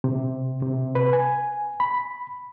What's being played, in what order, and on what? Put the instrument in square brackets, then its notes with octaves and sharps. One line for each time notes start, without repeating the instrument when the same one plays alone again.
[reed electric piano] C3
C3
B4
G#5
B5